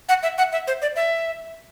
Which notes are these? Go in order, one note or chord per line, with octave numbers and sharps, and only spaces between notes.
F#5
E5
F#5
E5
C5
D5
E5